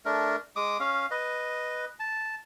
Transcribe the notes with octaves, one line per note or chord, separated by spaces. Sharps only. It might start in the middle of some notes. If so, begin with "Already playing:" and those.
A3 D4 A#4
G#3 D6 D#6
C#4 F5
B4 D#5
A5